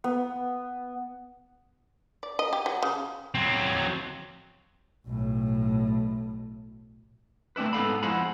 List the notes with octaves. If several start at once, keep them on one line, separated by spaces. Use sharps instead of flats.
B3
D5
D#5
G4
F#3
C#3
F#3 C4
B1 A2
A3 C4 D4 E4 B4
G#2 B3 A4 F5 B5
F2 G#3 E4 C5 F#5 B5